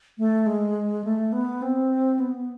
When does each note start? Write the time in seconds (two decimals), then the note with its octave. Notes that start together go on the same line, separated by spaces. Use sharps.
0.18 A3
0.46 G#3
1.04 A3
1.33 B3
1.62 C4
2.19 B3